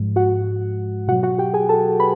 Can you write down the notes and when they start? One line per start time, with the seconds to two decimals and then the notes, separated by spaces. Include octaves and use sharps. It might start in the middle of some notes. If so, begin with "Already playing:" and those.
Already playing: G#2 F3 G#3
0.16 F#4 F#5
1.08 B2 F#4 F#5
1.12 F#3
1.23 F#4 F#5
1.38 G4 G5
1.54 G#4 G#5
1.69 A4 A5
2.00 B4 B5